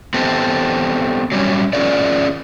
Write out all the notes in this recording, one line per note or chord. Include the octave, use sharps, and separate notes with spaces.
B3 C4 G4 A4
F#3 G3 A#3 C#4
C#4 F4 G#4 A#4 D5